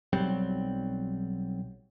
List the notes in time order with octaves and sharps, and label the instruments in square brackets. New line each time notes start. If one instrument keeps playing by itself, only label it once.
[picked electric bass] B1 F#3 G3 C4